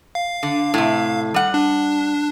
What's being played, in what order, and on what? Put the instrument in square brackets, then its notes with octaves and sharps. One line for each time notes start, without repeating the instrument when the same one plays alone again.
[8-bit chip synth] F5
[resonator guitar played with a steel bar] D3
A2 C3
G3 F#5
[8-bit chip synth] D4